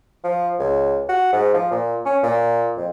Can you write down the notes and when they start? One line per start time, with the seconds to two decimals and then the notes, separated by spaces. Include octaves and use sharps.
0.24 F3
0.59 C#2
1.09 F#4
1.32 G#2
1.54 F3
1.72 A#2
2.06 C#4
2.23 A#2
2.77 F2